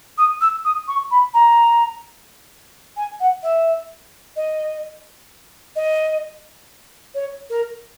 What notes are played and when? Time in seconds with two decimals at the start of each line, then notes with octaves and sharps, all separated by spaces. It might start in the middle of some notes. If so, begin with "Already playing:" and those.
0.18 D#6
0.41 E6
0.65 D#6
0.88 C#6
1.11 B5
1.34 A#5
2.97 G#5
3.20 F#5
3.43 E5
4.36 D#5
5.76 D#5
7.14 C#5
7.50 A#4